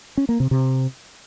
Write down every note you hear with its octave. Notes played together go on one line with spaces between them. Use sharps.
C#4
A#3
C3
C3